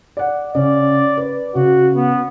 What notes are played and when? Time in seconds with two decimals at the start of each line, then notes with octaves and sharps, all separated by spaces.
0.17 D5 F#5
0.55 C#3 C#4 D5
1.17 B4
1.55 C#3 F#4
1.96 B3